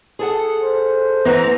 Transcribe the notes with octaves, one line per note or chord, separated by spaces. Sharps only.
G#4 A4 F#5
C5
E3 B3 A#5